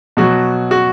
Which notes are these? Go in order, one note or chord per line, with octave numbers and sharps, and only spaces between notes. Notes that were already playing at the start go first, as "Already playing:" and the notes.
B2 F#3 F#4
F#4